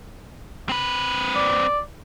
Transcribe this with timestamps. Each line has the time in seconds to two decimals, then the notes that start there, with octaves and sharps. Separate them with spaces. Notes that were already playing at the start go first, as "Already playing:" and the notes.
0.69 C4 B4
1.35 D5